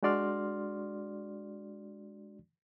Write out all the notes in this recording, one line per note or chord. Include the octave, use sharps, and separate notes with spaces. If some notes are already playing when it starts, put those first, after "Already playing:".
G#3 D4 F#4 D5 C6 F6